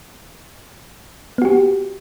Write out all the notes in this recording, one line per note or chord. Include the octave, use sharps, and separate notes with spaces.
B3 F#4 G4